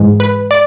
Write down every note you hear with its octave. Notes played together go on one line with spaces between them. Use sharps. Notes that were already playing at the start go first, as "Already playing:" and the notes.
Already playing: G#2 E3 G#3
B4
D5